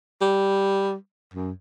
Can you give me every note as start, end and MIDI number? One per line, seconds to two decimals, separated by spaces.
0.21 0.94 55
1.34 1.51 42